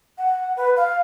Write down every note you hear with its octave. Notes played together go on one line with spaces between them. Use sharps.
F#5
B4
F5